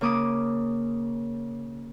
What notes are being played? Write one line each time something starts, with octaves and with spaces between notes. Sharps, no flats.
C#3 A#3 D6 D#6